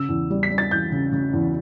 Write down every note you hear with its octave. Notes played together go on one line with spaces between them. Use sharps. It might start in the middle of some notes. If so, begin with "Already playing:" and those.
Already playing: C#3 E6
E2
G3
B6
G3
A6
E2 G6
C#3
C#3
E2